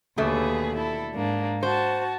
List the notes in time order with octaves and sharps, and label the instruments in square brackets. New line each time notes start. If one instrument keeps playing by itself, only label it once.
[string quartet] D#2 G#4 B4 [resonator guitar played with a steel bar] B2 D3 A3
[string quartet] E4 A4
G#2 A#3 D4
[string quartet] F#4 A5 [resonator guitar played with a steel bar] C5